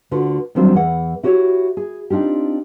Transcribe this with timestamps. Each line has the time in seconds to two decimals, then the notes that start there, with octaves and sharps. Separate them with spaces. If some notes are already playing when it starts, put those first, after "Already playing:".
0.11 D2 D3 F4 F#4 B4
0.55 D#3 F#3 G3 C4 D4 F4
0.74 E2 E3 F#5
1.23 E4 F#4 G4 B4 C#5
1.77 G#4
2.10 C4 D4 D#4 F4 G4